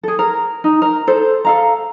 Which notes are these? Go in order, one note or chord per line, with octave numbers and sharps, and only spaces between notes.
G#4 A4
A#4
D#4
A#4
A4 C5
A4 F5 A#5